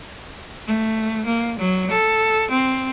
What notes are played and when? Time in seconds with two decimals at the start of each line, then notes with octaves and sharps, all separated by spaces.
0.67 A3
1.26 A#3
1.59 F#3
1.91 A4
2.51 C4